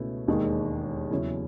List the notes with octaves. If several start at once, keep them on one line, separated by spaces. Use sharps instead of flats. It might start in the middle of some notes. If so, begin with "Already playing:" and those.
Already playing: C#2 B2 A3 C#4 E4
E1 D#2 D#3 G#3
E2 C#3 F#3 C#4 E4